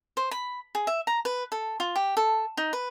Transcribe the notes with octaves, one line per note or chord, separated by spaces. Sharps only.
C5
B5
G#4
E5
A#5
B4
A4
F4
G4
A4
D#4
B4